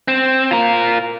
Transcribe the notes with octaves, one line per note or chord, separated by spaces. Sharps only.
C4
F4 A#4